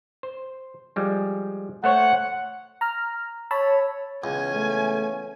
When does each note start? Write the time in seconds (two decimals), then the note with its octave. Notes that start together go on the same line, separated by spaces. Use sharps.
0.23 C5
0.96 F3 G3 G#3
1.84 A3 C5 C#5 F#5
2.81 A#5 F6
3.51 C#5 A5 B5 E6
4.24 C#2 E3 B3 C#4 G#5
4.54 A3